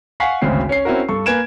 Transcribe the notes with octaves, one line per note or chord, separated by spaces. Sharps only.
F5 F#5 G#5 C#6 B6 C7
G#1 D2 C#3 G#3 C4 C7
C#4 C#5 C7
C4 C#4 E4 F#4 A#4
G2 A4 C#6
A#3 B4 G#5 G#6 D7 E7